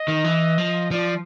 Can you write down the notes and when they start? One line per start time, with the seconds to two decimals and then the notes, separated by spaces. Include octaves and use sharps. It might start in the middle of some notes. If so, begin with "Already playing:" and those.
Already playing: D#5
0.08 D#3
0.24 E3
0.58 F3
0.91 F3 D5